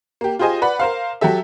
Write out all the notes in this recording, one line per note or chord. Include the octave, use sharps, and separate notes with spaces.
A#3 G4
F4 G4 G#4 C5 D#5 G#5
B4 D5 F#5 B5
A#4 C5 F5
F#3 F#4 G4 A4 E5